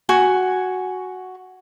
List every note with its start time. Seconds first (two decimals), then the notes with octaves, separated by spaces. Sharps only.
0.09 F#4 G#5 C#6